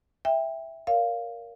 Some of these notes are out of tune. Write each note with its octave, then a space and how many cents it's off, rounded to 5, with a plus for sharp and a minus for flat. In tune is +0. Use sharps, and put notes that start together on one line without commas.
E5 +0 G5 +25
A#4 +0 C#5 +45 F5 +0